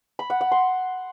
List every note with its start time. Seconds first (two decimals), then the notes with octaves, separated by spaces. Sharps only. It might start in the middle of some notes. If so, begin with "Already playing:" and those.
0.19 B5
0.30 F#5
0.41 F#5
0.52 C6